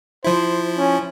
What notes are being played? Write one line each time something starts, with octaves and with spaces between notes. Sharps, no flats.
F3 E4 C5
C#4